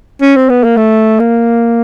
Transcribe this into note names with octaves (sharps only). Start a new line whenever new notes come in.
C#4
C4
B3
A#3
A3
A#3